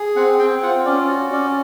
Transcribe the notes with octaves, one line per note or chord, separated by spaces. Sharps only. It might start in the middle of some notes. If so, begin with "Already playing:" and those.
Already playing: G#4
C4 F#5
C4 G5
F4 F#5
C#4 D5
F#4
C#4 D5